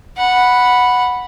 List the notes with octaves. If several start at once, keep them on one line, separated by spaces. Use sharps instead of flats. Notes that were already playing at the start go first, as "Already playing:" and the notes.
F#5 B5